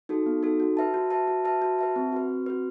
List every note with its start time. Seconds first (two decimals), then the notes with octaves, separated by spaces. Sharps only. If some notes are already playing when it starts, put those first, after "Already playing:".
0.09 D#4 F#4 A4
0.26 B3
0.43 D#4 F#4 A4
0.60 F#4
0.77 B4 E5 A5
0.94 F#4
1.11 B4 E5 A5
1.28 F#4
1.45 B4 E5 A5
1.62 F#4
1.79 B4 E5 A5
1.96 C4
2.12 F#4 B4
2.29 C4
2.46 F#4 B4